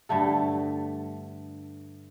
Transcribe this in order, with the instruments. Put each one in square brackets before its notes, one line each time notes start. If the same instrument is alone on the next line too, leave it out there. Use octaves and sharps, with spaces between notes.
[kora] G2 D3 A3 A4